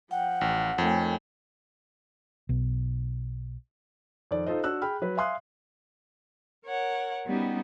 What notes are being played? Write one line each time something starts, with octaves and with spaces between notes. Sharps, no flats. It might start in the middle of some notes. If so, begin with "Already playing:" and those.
F3 F#5 G5
A1
F2 D#3 A3 C#5 G5 G#5
B1
F2 D#3 D5
D#4 F4 A4 C5 D#5
D4 F#4 E6 F#6
G#4 G5 B5 F6
F#3 B4
E5 F5 G#5 C6 D#6 F#6
A#4 C#5 F#5
G3 B3 C#4 D#4 F#4 G4